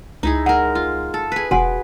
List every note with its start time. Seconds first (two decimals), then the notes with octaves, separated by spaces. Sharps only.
0.23 C#2 D#4 E4 G#4
0.46 G#3 A#4 F#5
0.75 F4
1.14 A4
1.32 G#4 B4
1.51 E1 F#4 B4 F#5 G#5